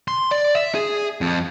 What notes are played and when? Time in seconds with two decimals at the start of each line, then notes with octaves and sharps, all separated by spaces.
0.08 C6
0.31 D5
0.55 E5
0.75 G#4
1.21 F2